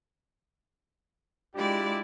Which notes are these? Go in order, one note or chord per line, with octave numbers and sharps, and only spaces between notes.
G#3 D4 E4 F4 G4 D5